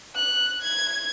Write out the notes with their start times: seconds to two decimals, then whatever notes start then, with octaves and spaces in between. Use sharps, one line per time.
0.15 F#6
0.62 G#6